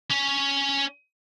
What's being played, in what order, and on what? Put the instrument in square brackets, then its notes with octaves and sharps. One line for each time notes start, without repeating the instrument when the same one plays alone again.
[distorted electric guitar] C#4